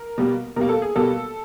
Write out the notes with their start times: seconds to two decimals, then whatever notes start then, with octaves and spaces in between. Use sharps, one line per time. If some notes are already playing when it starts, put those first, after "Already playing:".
Already playing: A#4
0.18 B2 G3 A#3
0.56 B2 G3 A#3 A#4
0.69 A4
0.82 G#4
0.95 B2 G3 A#3 A4